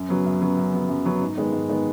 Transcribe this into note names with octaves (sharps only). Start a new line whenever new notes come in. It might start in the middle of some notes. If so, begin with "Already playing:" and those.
Already playing: F#2
C#3 F#3 B3
F#2
C#3 F#3 B3
F#2
C#3 F#3 B3
F#2
C#3 F#3 B3
G#2
D#3 G#3 B3
G#2
D#3 G#3 B3